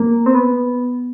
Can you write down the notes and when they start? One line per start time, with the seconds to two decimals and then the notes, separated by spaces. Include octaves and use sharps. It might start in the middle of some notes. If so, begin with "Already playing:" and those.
Already playing: A#3
0.26 C4
0.35 B3